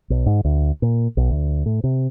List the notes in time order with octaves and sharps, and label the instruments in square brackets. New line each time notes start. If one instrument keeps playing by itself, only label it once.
[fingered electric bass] B1
G#2
D2
A#2
B1
D2
A2
C3